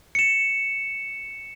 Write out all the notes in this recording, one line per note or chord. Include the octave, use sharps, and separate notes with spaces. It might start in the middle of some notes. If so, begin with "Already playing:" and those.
C#7 E7